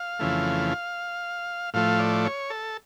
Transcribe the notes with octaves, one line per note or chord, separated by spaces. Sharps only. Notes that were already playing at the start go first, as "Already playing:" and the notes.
Already playing: F5
F2 C#3 E3 A3
A2 F3 A3 F5
D5
C#5
A4